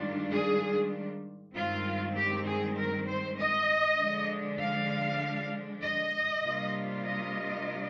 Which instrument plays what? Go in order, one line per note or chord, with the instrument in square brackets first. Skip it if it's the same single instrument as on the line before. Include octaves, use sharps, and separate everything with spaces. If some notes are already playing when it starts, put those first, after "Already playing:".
Already playing: [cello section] G#2 D#3 G3 D4 F4
G#4
G2 D#3 G#3 C4 F4
G4
G#4
A#4
C5
D#5
D3 F3 G#3 D4
F5
D#5
C3 G3 A#3 D4 F4
D#5